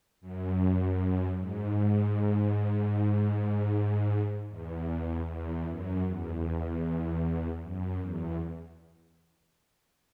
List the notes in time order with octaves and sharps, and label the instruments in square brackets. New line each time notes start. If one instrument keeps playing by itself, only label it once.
[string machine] F#2
G#2
E2
E2
F#2
E2
F#2
E2